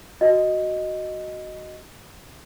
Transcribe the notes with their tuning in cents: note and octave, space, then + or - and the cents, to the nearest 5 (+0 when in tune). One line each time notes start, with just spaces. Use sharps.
F#4 +0 D#5 +0